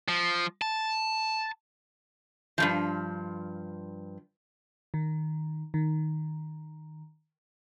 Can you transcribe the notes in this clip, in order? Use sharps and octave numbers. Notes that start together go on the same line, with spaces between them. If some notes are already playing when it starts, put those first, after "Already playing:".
F3
A5
G2 A#2 F3
D#3
D#3